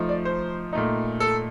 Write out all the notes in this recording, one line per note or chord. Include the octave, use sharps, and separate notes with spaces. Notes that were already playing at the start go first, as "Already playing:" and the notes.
Already playing: F3 A3 D#4
D5
C5
A#2 A3 D#4
A4